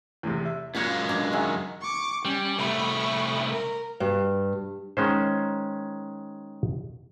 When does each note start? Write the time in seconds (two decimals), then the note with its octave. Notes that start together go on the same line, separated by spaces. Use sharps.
0.23 E2 A2 C3
0.45 E5
0.75 F#2 A#2 G#3 C#5 F5 F#5
1.08 B2 D4 A#5
1.33 D#3 C#4 G#4 E5 F#5
1.81 C#6 D6
2.25 G3 C#4
2.59 C2 A3 B5 C#6
3.50 A#4
4.00 G2
4.97 D#3 G#3 C#4 C5